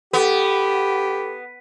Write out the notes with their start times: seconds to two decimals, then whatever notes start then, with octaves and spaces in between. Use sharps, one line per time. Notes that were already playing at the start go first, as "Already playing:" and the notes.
0.13 B3 G4 A4